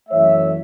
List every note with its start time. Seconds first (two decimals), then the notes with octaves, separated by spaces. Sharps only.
0.09 F#2 E3 A3 C#5 E5